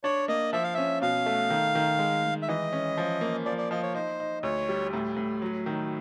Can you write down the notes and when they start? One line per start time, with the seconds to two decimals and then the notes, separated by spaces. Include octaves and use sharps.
0.04 D4 C#5
0.28 A#3 D#5
0.53 F3 E5
0.63 F5
0.74 C#4 E5
1.02 B2 F5
1.26 A3
1.50 D#3
1.75 D#3
1.99 G#3
2.24 G#3
2.42 E5
2.48 E3 D#5
2.73 C#4
2.98 F3
3.21 A#3
3.45 F3 D5
3.58 D5
3.71 F3 D#5
3.82 C#5
3.94 D#4 C5
4.20 D#4
4.43 D2 C#5
4.69 G3
4.93 A2
5.17 A2
5.42 F#3
5.66 D#3